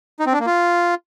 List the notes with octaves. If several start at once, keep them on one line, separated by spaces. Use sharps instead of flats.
D#4
C4
D4
A#3
F4